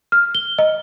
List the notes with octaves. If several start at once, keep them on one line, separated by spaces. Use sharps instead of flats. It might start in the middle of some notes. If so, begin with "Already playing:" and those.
F6
G7
D#5